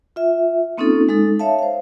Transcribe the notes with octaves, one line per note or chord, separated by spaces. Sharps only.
F4 E5
A#3 C4 C#4 D#4 F4 A4
G#3 D#4 A4
C#5 E5 F5 A5
C5 F5